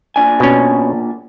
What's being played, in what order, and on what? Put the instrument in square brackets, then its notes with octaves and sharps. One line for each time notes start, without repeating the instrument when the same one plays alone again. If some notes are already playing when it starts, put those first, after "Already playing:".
[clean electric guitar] A#2 D4 G#5
[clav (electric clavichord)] B2 C#4